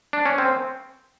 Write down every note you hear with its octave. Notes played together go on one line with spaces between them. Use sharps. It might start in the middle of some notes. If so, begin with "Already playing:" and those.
D4
C#4
C4